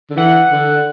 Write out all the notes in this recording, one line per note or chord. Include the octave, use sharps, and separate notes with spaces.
D3
E3 F#5
D3